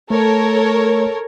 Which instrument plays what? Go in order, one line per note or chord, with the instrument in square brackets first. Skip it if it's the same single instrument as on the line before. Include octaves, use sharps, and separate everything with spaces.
[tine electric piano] A3 [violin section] A4 A#4 C#5